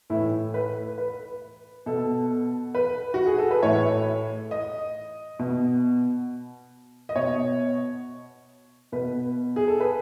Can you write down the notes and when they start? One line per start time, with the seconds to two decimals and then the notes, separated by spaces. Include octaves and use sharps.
0.10 A2 E3 E4
0.54 B4
0.98 B4
1.86 B2 A4
2.75 B4
3.14 F#4
3.27 G#4
3.38 A4
3.51 B4
3.63 A2 E3 C#5
4.51 D#5
5.39 B2
7.09 D#5
7.16 B2 C#5
8.92 B2 B4
9.56 G#4
9.68 A4
9.80 B4